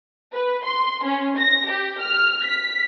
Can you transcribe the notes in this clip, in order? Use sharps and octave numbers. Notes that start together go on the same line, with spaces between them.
B4
C6
C#4
A#6
G4
F6
B6